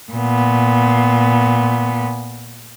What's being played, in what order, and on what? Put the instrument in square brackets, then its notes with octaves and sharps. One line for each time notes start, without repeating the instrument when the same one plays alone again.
[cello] A#2 B3